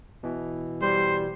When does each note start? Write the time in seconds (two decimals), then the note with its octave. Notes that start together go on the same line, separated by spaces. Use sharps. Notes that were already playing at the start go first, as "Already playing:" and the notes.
0.23 B2 E3
0.82 G3 C5